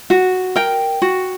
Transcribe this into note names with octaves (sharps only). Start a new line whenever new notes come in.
F#4
A#4 G5
F#4